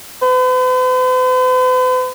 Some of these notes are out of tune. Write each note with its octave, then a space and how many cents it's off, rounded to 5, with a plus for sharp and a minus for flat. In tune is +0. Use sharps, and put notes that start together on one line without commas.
B4 +45